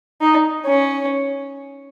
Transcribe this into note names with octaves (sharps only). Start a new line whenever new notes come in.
D#4
C#4